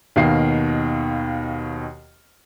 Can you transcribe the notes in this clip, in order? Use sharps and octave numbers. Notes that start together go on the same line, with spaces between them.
D#2 B2 D#3 F5 C7